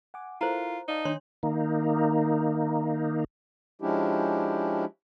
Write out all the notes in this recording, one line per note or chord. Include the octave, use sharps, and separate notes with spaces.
F#5 G#5 D6
E4 F4 A4 A#4 C5 A#5
D#4 D5 F5 A5
D#3 D4 C#5 C6
D#3 A#3 D#4
F3 G#3 C#4 D4 E4 G4